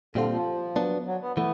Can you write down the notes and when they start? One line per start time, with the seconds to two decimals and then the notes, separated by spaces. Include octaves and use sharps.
0.15 A#2 D3 G3 C4 F4
0.31 F3
0.76 F#3 B3 D4
1.06 F#3
1.22 B3
1.36 E3 A3 B3